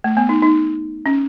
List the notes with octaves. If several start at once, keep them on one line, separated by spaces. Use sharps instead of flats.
A3
B3
D#4
D#4
C#4